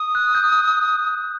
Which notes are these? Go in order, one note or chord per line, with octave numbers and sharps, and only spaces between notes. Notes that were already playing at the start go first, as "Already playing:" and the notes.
Already playing: D#6
F#6
G6